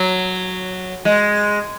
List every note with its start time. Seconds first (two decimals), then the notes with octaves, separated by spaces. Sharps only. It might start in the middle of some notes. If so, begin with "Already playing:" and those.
Already playing: F#3
1.05 G#3